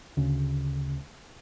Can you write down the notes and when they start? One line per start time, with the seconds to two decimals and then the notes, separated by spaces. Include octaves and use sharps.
0.17 D2 C#3